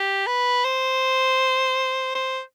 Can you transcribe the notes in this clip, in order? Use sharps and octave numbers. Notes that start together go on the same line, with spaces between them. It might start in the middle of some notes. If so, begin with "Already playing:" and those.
Already playing: G4
B4
C5
C5